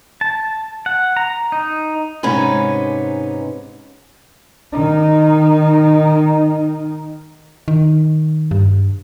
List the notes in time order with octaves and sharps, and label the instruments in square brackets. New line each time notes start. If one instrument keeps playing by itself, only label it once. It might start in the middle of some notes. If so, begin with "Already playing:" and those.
[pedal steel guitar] A5
F#5
A#5
D#4
[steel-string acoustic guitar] G#2 C3 C#4 D#4 B4 G#5
[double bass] D#3 D#4
[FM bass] D#3
G2